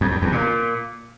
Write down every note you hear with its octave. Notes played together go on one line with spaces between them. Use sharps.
F2
E2
E2
A#2